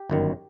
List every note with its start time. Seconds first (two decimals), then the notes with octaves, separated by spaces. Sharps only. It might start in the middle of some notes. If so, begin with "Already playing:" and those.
Already playing: G4
0.10 G1 F#2 D#3